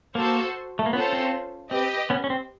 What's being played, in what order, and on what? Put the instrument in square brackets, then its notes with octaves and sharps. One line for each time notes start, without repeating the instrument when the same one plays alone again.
[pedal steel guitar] A#3 [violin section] F#4 A4 C5
[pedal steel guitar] A3
A#3
[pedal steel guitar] B3 [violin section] C#4 F4 A4 C5
[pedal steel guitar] C4
[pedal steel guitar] C4 [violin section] G4 B4 D#5
[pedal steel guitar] B3 C#4
C#4
C4